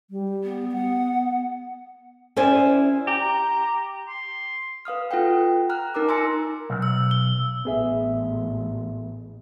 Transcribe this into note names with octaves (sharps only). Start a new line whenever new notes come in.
G3
B3
F#5
C#4 E4 C5 D5 G#5
G4 A#5
C6
B4 F5 D#6 F6
F4 A4 B4 F#5 G5
A#5 F6 F#6
D#4 A#4 A#5 D6
G#5 C6 E6 A#6 C#7
B1
E6
G7
A1 B3 G#4 E5